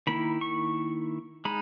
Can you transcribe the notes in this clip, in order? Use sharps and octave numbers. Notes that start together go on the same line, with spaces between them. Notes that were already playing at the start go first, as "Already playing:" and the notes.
D#3 A#3 E4 B5
C#6
G#3 D#4 B5